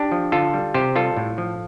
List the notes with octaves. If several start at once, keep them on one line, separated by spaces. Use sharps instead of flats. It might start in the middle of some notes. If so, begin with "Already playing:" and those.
Already playing: D4 G4
F3
D3 F4 A4
G3
C3 G4 C5
G3 F4 A4
A2
F3